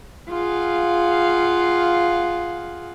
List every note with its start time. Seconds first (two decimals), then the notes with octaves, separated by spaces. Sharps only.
0.30 F4 G#4 F5 F#5